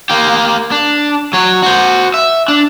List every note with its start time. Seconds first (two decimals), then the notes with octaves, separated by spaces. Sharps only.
0.10 A#3 G4
0.71 D4
1.33 F#3 C#5
1.63 F#4 C5
2.14 E5
2.48 D4